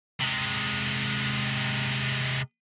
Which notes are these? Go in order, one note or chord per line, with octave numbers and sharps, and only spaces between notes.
C3 G#3